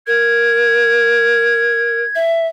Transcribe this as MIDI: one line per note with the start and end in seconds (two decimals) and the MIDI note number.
0.07 2.03 70
0.07 2.17 92
2.15 2.47 76